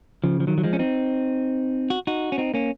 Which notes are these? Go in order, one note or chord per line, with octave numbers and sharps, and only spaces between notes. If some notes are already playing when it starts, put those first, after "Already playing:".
C#3 F3
F3
D#3 F#3
F#3
F3 G#3
C#4
C4 D#4
F#4
D#4 F#4
C#4
C4 D#4
A#3 C#4